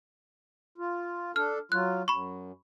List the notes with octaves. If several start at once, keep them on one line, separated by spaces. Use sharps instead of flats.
F4
D4 A4 F6
F#3 F4 F#6
F#2 B5 C#6